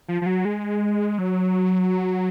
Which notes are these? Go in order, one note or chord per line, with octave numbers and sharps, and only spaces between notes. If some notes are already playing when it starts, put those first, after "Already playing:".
F3
F3
F#3
G#3
F#3